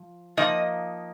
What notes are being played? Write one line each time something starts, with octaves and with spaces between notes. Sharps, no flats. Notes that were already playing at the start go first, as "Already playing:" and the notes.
Already playing: F3
F3 A#3 D#4 D#5